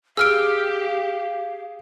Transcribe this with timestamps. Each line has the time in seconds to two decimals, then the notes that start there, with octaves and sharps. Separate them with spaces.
0.17 G4 G#4 F5 E6 F6 D7